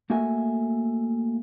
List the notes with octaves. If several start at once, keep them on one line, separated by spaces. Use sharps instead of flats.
A3 A#3 F#4 A4 E5 G#5